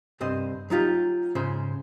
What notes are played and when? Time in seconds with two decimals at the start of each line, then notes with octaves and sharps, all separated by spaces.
0.20 C2 G2 C4 C5 D#5
0.70 F#3 D#4 F4 G4
1.35 G#2 C#3 G#3 C5